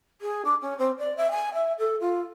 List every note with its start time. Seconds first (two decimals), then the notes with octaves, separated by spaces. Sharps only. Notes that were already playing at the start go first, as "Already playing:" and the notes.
0.21 G#4
0.44 D4
0.61 C#4
0.78 C4
0.98 D5
1.17 E5
1.31 G#5
1.53 E5
1.78 A4
2.00 F4